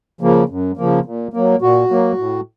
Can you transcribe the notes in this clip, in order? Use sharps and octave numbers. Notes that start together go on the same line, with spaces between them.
C#3 F3 A#3
F#2
C#3 F3 A#3
A#2
F#3 A#3
A#2 F#4
F#3 A#3
A2